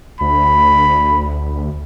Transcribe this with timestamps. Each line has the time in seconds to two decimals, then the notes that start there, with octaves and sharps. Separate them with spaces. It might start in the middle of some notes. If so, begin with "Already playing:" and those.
0.21 D2 B5